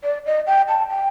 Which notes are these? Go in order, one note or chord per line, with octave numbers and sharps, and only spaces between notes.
D5
D#5
G5
A5
G5